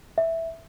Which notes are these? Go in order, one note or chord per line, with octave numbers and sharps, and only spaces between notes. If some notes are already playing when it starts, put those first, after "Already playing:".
E5